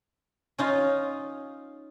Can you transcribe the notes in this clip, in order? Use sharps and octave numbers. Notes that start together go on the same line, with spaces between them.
C#4 D#4 F4